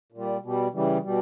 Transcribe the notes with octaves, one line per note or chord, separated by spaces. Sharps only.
A#2
G3
B2 G3
C#3 E3 G3
B2 G3